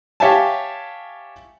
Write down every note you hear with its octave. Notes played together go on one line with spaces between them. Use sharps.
G4 C#5 E5 F5 G#5 A5